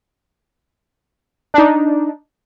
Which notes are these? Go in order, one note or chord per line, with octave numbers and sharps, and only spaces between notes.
D4 D#4